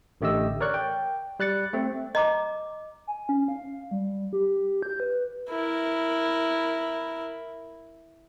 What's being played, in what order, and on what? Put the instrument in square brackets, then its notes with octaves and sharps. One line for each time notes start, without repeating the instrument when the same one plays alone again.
[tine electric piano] A1 D3 A3 G4 D#5 E6
A#4 C#5 D5 C#6 F#6
G5
G3 F#6 A6 C#7
A3 C4
[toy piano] D#5 A#5 D6
[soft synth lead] G#5
C#4
F5
G3
G4
G6
B4
[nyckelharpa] E4 A#4